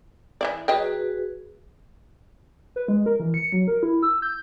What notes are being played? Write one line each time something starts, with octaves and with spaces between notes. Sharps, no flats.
E3 E4 D5
F#3 F#4 G#4 B4 D#5 G5
B4
G#3
A#4
E3
C#7
F#3
A#4
E4
E6
G6